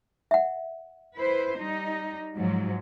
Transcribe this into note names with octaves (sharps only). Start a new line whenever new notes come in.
E5 F#5
E4 B4 C5
G3 D#4
G#2 F3 F#3